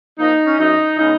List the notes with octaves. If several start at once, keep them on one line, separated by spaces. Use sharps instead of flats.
F3 A#3 D#4
C#4
F#2 D#4
C#3 G#3 B3 D#4